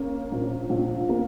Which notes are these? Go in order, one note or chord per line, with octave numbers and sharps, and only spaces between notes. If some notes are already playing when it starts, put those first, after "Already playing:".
Already playing: A#3 C#4
A#1
A#1
A#3